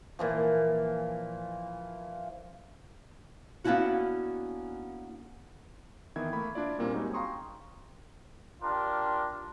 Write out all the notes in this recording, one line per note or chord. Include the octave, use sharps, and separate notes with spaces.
A#2 E3 F3
A#3 B3 C#4 D4 E4 F#4
D#3 E3 B3 E5 G#6
A3 A#3 B5
D4 E4 F4 D5
A#2 G3 A#3 C4 C#4
G3 G#3 C4 C#4 D#4 F#4
F5 G5 A#5 C6 C#6 D#6
D4 F4 G4 A#4 C6